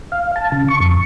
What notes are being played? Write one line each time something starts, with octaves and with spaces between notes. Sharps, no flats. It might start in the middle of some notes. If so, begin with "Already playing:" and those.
F5
A5
C#3
C#6
F2